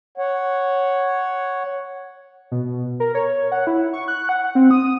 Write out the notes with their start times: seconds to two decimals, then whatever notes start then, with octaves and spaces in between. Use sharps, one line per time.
0.18 C#5 F#5
2.51 B2
3.00 A#4
3.15 C#5
3.52 F#5
3.67 E4
3.93 C#6
4.08 F#6
4.29 F#5
4.55 C4
4.71 D#6